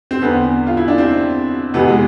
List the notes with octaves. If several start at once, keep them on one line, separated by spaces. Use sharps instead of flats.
C4
E2 D3 B3
F4
E4
D4
C4
F2 C3 E3 B3
G#3